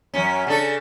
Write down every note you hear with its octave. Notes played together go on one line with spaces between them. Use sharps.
F#2 C#4
C#3 D4 A4